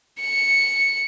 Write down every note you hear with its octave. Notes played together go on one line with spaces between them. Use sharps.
C#7